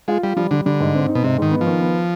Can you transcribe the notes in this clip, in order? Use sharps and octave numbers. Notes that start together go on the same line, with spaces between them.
G#3 F4
G3 F4
F3 G3
D3 G3
D3 G3
G#2
C4
D#4
B2
G#2 C3
G#2 D#3
B3
F3
D#3
B3